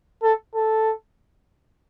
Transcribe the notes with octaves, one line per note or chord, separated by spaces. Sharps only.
A4
A4